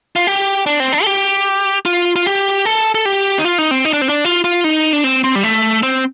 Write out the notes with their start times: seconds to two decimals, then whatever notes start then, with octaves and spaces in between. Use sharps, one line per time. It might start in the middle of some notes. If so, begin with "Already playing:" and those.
0.16 F4
0.27 G4
0.66 D4
0.80 C4
0.93 D4
1.03 A4
1.06 G4
1.85 F4
2.16 F4
2.26 G4
2.65 A4
2.95 A4
3.05 G4
3.39 D#4
3.45 F4
3.58 D#4
3.71 C4
3.85 D#4
3.93 D4
4.01 C4
4.09 D4
4.25 F4
4.44 F4
4.64 D#4
4.93 D4
5.04 C4
5.24 C4
5.35 G3
5.43 A3
5.83 C4